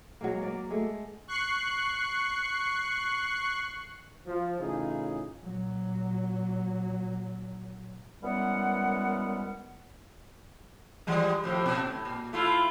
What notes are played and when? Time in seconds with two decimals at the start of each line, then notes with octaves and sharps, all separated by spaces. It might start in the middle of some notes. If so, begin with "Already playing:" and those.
0.21 F#3 G#3 A#3
0.43 A#3 D5
0.70 G#3 A3
1.28 C#6 F#6 C7
4.26 F3
4.60 A2 C#3 E3 D#4 F4 G#4
5.43 A#2 F#3
8.23 F#2 E3 G3 G#3 B3 F#5
11.07 E3 G3 G#3
11.44 A2 F3 G4
11.66 B2
11.87 A2
12.05 A#2
12.33 A3 E4 F4